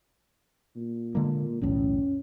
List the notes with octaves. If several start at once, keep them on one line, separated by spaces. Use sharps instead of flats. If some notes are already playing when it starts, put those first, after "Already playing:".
A#2
D3 G#3 A#3
B1 E2 A2 C#4